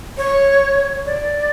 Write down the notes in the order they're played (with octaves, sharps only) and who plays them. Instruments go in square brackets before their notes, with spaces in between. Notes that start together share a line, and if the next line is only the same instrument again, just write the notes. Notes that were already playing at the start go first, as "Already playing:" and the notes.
[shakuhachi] C#5
D5